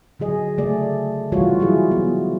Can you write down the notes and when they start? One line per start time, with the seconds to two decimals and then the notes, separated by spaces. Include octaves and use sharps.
0.20 D3 F#3 G#4 D#5
0.58 C#3 A3 G#4 D5
1.32 C3 E3 G3 F4 F#4 C#5
1.60 F#3 E4 G#4
1.91 B3